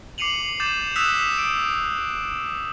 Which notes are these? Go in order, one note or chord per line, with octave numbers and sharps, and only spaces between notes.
D6 C7 C#7 D#7 F7 F#7
D6 G6 A6 E7
D#6 E6 F#6 B6 E7 F7
D7